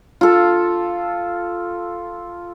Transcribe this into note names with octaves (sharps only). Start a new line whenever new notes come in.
F4 A4